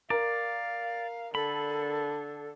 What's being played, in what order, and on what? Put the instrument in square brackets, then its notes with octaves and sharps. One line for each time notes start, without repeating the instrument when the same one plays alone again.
[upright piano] A#4 [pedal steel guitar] D5 [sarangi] F5
[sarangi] D3 [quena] A4 [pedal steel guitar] B5